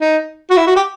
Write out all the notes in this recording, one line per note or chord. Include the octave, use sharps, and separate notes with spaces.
D#4
F#4
E4
F#4
G4